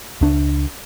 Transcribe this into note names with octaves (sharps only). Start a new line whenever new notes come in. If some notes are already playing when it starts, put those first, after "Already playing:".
C#2 D4